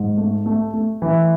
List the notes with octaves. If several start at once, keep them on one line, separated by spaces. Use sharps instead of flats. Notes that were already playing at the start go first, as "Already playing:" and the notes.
Already playing: G#2
A3
A3
A3
E3